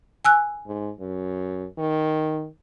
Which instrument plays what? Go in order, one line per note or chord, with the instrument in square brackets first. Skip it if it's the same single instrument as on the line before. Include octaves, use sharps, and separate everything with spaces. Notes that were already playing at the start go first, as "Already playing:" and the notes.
[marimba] G#5 E6 F#6
[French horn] G#2
F#2
D#3